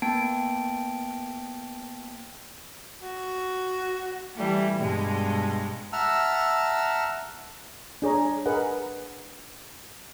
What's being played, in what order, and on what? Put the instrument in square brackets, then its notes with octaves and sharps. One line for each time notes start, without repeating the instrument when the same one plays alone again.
[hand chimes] A#3 B3 G5 A5 D7
[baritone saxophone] F#4
[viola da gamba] E3 G3 A3
G2 B2 G#3
[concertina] E5 F#5 A5 A#5 E6 F6
[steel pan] D4 G#4 C#5 A#5
G#4 A#4 B4 D#5 F#5